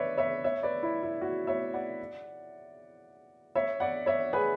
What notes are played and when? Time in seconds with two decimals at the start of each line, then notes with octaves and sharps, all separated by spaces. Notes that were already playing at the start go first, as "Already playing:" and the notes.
Already playing: B4 C#5 D5 E5
0.17 C#5 E5
0.44 C#5 E5
0.63 B4 D5
0.83 E4
1.03 E4
1.21 F#4
1.47 C#5 E5
1.74 D5 F#5
3.55 C#5 E5
3.80 D5 F#5
4.06 C#5 E5
4.33 G#4 B4